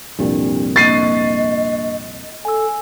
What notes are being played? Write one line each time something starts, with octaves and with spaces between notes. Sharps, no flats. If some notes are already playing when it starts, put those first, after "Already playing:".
C2 F2 A#2 D4 G4
A#3 D4 D#5 C#6 A6 C7 D#7
A4 G#5 E6